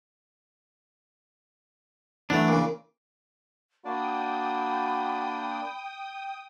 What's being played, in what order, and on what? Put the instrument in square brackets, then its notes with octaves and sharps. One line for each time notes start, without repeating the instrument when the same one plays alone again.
[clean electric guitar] E3 D4 [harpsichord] F#3 A3
[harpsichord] A#2 C#3
[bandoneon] A#3 D4 D5 [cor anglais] F#4 [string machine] G5 D#6 [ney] B5